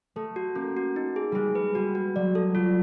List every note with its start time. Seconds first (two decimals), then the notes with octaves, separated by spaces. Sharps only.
0.16 A3 A4
0.36 F#4
0.55 A#3 C#4
0.77 F#4
0.96 D#4
1.16 G#4
1.32 G3 G#3 G#4
1.55 B4
1.75 G3 F#4
1.95 F#4
2.16 F#3 D5
2.35 A4
2.55 F#3 F4